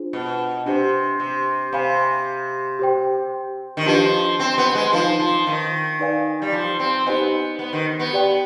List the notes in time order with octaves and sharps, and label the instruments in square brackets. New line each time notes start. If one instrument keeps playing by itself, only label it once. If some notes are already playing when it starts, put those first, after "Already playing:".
Already playing: [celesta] D4 F4 G#4 C5
[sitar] B2
[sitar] C3 [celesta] D4 G4 C5
[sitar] C3
[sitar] C3 [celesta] C5 F5 G#5 B5
[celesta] G4 C5 G5
[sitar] D#3
[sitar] F3 [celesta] D4 G4 B4 D#5
[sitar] C4
B3
G#3
[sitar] F3 [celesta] D#4 B4 F5
[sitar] F3
D#3
[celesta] D#4 B4 D5 F5 G#5
[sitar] G3
F3
C4
[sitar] B3 [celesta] D#4 G4 C5 D#5 G#5
[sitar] B3
D#3
B3
[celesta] G4 D5 G5